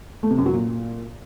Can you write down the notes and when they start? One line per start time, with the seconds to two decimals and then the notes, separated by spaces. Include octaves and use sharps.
0.23 A3
0.31 C3
0.38 F#2
0.46 F#3
0.53 A#2